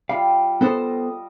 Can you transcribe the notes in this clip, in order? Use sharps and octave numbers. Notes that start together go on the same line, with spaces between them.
G3 F4 F5
B3 A4 C5 D#5